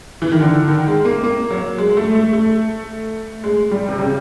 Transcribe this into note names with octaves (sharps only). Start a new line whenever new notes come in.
E3
D#3
D3
D#3
G#3
A#3
A#3
F#3
G#3
A3
A3
A3
G#3
G3
C3
C#3